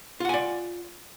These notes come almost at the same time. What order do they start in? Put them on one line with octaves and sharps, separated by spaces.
F4 F#5 G#5 D5